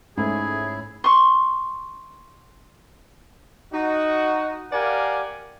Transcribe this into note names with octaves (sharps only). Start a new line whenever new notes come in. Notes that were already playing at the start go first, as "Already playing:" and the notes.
G#2 A3 C#4 E4 G#4
C6 C#6
D#4 F#4
G4 A#4 D5 F5 F#5 G#5